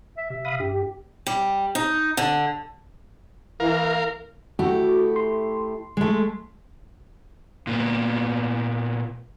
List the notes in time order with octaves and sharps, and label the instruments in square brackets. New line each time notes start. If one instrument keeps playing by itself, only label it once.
[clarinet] E5
[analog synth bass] C3 [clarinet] E5
[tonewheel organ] F5 B5 D#6
[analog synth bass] G2 [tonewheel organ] G4
[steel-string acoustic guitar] G3
D#4
D3
[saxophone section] E3 [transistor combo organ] A#4 F5
[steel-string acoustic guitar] A3 E4 G4 [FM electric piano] F#4
[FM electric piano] C6
[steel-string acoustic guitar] G#3 A3
[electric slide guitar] A#2 A#3 B3